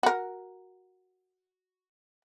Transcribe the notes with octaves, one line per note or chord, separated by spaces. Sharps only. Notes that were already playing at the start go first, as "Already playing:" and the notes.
F#4 A#4